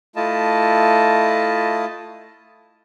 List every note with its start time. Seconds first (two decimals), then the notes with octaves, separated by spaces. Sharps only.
0.16 A3 E4 F4 D#5 A5